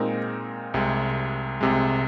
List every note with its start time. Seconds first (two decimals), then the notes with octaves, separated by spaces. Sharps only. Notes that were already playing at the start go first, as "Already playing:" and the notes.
Already playing: A#2 G#3 C4 D#4 A#4
0.74 C2 C3 G#3
1.61 C2 C3 G#3